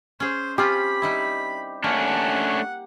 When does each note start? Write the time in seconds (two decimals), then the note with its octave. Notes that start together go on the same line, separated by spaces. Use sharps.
0.20 C#4 G#4 C5
0.58 C4 C#4 F4 G4 B5
1.02 G3 D#4 E4
1.84 A3 A#3 C#4 D4 F#5